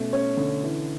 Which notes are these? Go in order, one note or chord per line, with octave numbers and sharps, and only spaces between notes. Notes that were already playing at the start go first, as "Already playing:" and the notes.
Already playing: B2 A3 C#4
C#4 C#5
D3
E3